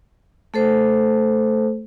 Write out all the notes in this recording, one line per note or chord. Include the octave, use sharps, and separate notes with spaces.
A3 A4 C5